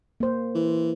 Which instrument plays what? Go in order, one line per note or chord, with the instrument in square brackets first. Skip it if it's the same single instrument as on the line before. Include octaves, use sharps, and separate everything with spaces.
[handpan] A#3 C5
[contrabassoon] E3